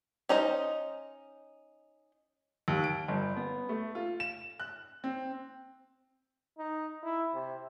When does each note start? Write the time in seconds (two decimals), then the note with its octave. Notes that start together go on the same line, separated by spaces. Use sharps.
0.29 C#4 D#4 C5 D#5
2.68 D#2
2.84 D7
3.08 G1
3.37 B3
3.69 A3
3.95 F4
4.20 E7
4.60 F#6
5.04 C4
6.58 D#4
7.03 E4
7.34 C3